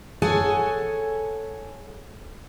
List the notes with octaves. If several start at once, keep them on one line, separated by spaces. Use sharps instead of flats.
G#4 A4 C#5 F#5 G#5